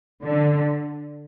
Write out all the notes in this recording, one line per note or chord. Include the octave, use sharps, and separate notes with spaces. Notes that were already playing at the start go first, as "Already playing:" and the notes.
D3